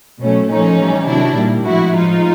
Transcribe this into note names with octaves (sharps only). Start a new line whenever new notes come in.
B2 F#3 A3 C#4
A#2 F3 A3 C#4 D#4
A2 E3 G3
C3 D#3 F#3 D4 E4
A#2 G3
A2 F3 G#3 E4 F#4
A2 F3 G#3 D#4 F4